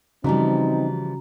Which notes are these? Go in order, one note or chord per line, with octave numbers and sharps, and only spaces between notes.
C#3 E3 F3 G3 C4 D#4 F#4 A#5